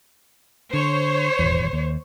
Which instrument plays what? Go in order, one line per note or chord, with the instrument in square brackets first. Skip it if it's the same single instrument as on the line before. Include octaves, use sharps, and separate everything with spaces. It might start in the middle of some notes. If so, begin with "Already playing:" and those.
[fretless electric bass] D3 [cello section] C5 C#5
[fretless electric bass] D#1 G#1 E2
D#2